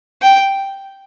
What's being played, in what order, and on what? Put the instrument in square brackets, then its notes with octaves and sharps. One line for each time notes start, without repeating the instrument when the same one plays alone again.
[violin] G5